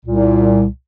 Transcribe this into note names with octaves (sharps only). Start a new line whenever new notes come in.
C2 A#2